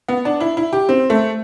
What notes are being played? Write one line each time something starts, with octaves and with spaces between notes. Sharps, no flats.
B3
D4
E4
E4
G4
C4
A3